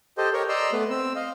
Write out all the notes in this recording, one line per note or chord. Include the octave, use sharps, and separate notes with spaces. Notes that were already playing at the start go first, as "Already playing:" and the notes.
G4 A4 C5 D#5
G4 A#4 C#5
D5 D#5 A#5 C6 E6
A3 B3 B4
C4 E6
D#5 F5